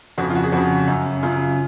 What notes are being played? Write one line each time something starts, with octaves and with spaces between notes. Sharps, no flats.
F2 C#3 F#4
F4
F#4
G#4
F2 C#3 F#4
F#2 C#3
F#2 C#3 F4